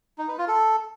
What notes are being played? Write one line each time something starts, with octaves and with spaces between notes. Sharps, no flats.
D#4
B4
F4
A4